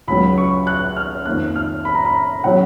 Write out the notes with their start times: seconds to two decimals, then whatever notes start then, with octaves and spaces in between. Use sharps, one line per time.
0.08 C#2 C#3 F#3 B5
0.38 C#6
0.67 F#6
0.96 F6
1.26 F2 D#3 A#3 F#6
1.56 F6
1.85 B5
1.95 A#5
2.05 B5
2.44 C#3 F#3 C#4 F#5